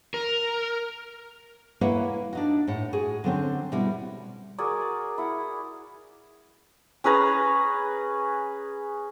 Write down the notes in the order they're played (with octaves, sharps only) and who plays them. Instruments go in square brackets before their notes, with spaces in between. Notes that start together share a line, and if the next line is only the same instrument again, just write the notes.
[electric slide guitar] A#4
[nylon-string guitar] A#3 E4 B4 C#5 E5 F#5
D4 D#4 F#4
A2 F#5
F#4 G#4
D3 F#3 C4 C#4
B2 G3 E4 F#4
[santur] F#4 G#4 A#4 D5
E4 F#5
C#4 G#4 B4 A#5